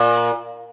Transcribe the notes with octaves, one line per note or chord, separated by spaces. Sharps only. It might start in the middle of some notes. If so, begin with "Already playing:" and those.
Already playing: A#2